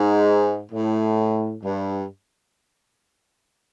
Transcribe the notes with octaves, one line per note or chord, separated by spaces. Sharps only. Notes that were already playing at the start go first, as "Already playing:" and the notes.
Already playing: G#2
A2
G2